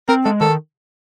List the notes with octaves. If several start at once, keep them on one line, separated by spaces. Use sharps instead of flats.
C4 A#4
G#3 A4
D#3 A4